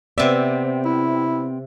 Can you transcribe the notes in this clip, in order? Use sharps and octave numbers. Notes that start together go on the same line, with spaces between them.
C3 B3 C4 D5 E5
E4